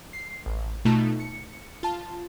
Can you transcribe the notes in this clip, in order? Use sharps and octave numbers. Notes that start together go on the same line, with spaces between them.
C7
A1
B2 A3 D#4 F4 A5
C#7
F4 A5